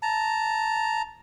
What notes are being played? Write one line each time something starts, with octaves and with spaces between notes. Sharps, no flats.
A5 A#5